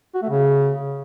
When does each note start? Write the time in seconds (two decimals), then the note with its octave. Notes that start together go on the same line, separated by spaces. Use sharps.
0.15 F#4
0.22 A3
0.29 C#3